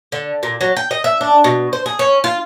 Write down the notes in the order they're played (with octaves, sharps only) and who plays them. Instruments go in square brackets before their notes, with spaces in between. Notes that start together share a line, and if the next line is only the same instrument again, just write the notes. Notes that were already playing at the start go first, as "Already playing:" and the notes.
[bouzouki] D3
A#2
F#3
G5
D#5
E5
D4
B2
C5
G#4
C#4
F4